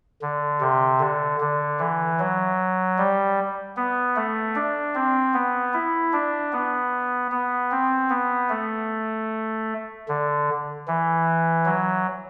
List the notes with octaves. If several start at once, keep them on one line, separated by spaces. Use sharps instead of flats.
D3
C3
D3
D3
E3
F#3
G3
B3
A3
D4
C4
B3
E4
D4
B3
B3
C4
B3
A3
D3
E3
F#3